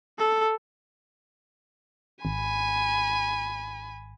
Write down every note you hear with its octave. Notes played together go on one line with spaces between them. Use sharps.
A4
G#1 G#5 B5